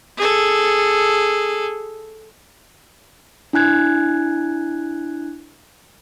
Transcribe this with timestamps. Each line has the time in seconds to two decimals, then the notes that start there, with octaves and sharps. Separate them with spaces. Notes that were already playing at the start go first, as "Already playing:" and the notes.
0.17 G#4 A4
3.53 D4 E4 G#5 F#6 G#6